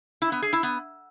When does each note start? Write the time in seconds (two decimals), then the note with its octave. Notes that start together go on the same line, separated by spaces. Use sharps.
0.22 E4
0.32 B3
0.42 G#4
0.53 E4
0.63 B3